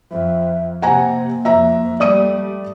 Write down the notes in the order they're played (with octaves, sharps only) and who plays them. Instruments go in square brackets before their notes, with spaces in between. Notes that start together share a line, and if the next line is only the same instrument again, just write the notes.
[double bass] F2 [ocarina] E5
[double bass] C3 [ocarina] A#3 [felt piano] F#5 G#5 A#5
[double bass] F2 [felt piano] E5 A#5
[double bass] G3 A3 [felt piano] D5 D#6 D#7